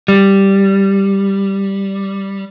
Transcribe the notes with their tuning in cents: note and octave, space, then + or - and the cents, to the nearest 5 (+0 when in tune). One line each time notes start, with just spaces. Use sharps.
G3 +0